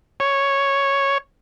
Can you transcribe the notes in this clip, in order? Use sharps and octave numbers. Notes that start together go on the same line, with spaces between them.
C#5